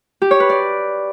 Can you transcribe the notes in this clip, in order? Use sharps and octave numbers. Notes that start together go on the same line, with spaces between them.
G4
C#5
B4
D5